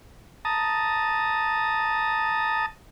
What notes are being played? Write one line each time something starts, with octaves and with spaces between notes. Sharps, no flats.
A5 A#5 D#6